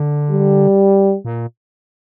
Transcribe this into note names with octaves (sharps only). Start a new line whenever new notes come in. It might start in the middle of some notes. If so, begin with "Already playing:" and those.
Already playing: D3
G3
A#2